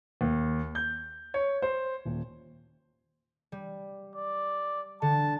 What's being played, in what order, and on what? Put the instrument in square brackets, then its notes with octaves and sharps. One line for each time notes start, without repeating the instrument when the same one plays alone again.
[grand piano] D#2
G6
C#5
C5
D#1
[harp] G3
[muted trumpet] D5
[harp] D3 [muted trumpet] A5